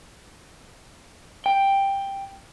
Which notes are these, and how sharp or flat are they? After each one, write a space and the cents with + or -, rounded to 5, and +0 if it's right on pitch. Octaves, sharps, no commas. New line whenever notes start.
G5 +5